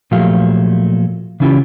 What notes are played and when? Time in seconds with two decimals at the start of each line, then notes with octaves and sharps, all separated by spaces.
0.11 A#2 F3 F#3 A3 G4 F5
1.40 C#3 E3 C#4 E4 F4 G4